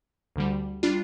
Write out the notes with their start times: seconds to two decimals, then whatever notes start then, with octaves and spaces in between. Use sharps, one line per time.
0.36 D2 D3 G3
0.83 G3 D4 F4